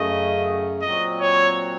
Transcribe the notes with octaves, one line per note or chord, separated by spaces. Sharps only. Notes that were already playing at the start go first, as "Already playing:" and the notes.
Already playing: F#2 C#3 A3 D#5
A#2 F#3 C4 F#4 D#5
C#5